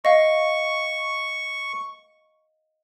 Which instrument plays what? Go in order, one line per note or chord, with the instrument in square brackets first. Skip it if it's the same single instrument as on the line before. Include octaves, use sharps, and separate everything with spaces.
[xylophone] D#5 F5 [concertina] C#6